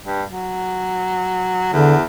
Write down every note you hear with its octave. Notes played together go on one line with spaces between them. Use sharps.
G2
F#3
E2 D3